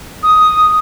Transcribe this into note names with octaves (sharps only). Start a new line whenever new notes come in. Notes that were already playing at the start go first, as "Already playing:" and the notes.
D#6